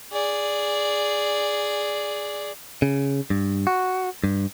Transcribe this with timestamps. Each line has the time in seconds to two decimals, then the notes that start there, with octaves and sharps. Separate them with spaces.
0.12 G#4 D5
2.82 C#3
3.30 G2
3.67 F#4
4.24 G2